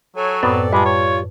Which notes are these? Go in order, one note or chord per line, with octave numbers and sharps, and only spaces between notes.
F#3 A4 C#5 G#5
F#2 A2 B3 C4 A4 D5
G3 G#3 F4 B4 A5
C#5